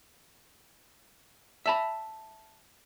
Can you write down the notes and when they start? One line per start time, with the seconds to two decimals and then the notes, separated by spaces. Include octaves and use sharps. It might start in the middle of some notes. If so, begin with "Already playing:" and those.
1.66 E5 A5 B5